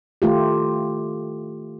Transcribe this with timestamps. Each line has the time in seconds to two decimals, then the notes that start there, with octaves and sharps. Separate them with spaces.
0.22 D#3 A3 F4 G4